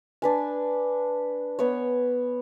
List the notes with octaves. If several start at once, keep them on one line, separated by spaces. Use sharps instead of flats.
D4 B4 G#5
B3 C#5